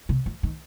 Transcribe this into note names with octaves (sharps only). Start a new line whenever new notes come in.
C3
F3
D#3